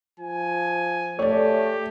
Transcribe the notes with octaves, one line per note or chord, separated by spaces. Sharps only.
F3 G#5
A3 G4 C#5 D5